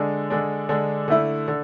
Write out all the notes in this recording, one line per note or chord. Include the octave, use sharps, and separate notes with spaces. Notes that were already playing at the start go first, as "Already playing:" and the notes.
Already playing: D3 G#3 D4
D3 G#3 D4
D3 G#3 D4
D3 A3 E4
D3